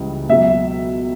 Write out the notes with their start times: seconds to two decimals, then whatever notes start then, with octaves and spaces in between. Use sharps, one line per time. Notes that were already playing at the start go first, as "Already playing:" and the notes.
Already playing: C#2 C#3 E3 G3
0.29 C#2 B2 F#3 E5